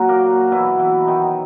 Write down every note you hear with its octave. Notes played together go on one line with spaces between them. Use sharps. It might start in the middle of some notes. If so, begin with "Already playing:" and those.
Already playing: A#2 F#3 F#4
A#3 A#4
B2 E3 F#3 E4
E3 E4
D#3 D#4